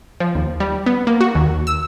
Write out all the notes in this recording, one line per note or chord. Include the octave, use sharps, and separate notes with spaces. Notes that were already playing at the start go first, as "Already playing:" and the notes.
F3
D#2
G3
B3
A#3
F#4
D#2
E6